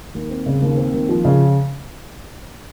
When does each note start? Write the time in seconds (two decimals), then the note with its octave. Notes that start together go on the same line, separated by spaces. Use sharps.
0.15 D#2
0.30 C4
0.46 C#3
0.62 D#2
0.77 C4
0.94 D#2
1.09 F3
1.25 C#3